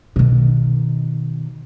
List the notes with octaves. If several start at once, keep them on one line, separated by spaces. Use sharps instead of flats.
B2 D#3